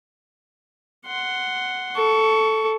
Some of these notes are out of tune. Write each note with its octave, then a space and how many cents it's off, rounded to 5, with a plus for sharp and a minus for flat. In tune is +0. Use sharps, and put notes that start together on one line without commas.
F#5 +0 C6 -5
A4 +0 C#6 +20